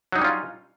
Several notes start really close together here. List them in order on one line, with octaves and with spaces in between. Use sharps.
F#3 D#4 G3 C#4 F4